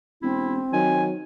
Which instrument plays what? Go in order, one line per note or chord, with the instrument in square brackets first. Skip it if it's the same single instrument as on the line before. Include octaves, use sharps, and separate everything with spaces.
[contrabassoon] E1 [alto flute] C4 [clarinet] E4
[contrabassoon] D#3 [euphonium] F#3 [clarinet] G#5